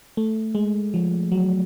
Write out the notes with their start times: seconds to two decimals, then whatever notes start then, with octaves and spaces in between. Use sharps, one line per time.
0.17 A3
0.55 G#3
0.94 F3
1.32 F#3